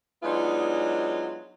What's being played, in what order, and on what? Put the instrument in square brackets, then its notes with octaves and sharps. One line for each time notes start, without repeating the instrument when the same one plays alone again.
[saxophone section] F#3 G#3 B3 D4 D#4 F4